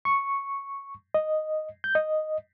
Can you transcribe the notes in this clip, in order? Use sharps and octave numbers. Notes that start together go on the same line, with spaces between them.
C#6
D#5
G6
D#5